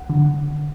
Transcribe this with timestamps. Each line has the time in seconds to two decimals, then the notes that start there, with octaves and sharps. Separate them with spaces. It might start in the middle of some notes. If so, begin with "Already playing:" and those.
Already playing: F#5
0.09 D3